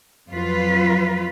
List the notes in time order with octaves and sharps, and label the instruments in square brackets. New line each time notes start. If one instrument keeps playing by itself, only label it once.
[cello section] F2 F#3 F4 B4